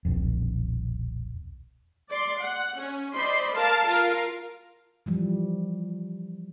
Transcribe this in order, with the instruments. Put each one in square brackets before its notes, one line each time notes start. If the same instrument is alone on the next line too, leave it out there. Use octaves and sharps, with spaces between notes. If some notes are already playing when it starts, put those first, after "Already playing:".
[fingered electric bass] D#1 B1 F2
[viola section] D5 C6
F#5
C#4
C5 D5 D#5 B5 C6
A#4 F5 A5
F4 A#4 F5
[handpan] E3 F3 G3